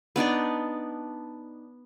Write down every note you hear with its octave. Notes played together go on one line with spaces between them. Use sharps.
B3 D4 D#4 D5